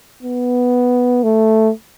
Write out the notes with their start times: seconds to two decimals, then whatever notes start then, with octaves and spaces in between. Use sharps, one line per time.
0.23 B3
1.23 A3